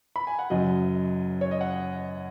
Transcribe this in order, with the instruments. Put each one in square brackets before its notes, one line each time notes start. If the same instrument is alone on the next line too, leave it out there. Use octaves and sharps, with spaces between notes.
[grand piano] B5
G#5
F#5
F#1 F#2 F#3 D#5
C#5
D#5
F#5